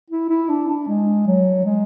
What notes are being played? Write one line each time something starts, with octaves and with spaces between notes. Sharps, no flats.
E4
E4
D4
D4
G#3
F#3
G#3